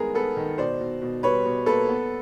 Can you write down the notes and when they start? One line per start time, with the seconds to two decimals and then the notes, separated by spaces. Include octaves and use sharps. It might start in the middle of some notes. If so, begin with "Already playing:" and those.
Already playing: G2 D#3 G#3 B3 G#4 A#4
0.14 B3 A4 B4
0.36 D#3
0.58 B2 C5 D5
0.81 B2
1.02 B2
1.23 G3 B4 C#5
1.45 B2
1.66 A#3 A4 B4
1.89 B3